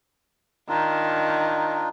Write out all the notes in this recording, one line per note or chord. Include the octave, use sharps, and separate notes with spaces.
D#3 D4 D#4 F4